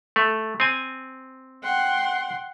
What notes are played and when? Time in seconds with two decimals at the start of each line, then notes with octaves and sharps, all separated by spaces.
0.16 A3
0.60 C4 G#5
1.63 F#5 G5 C6